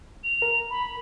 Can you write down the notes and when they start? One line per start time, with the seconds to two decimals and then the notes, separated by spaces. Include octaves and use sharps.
0.24 F7
0.42 A#4
0.70 B5